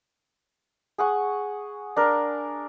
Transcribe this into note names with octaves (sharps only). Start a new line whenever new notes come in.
G#4 F#5 C#6
D4 A#4